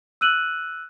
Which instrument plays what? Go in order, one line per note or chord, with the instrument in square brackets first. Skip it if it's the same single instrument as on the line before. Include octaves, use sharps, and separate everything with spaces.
[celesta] E6 F#6 D#7 F#7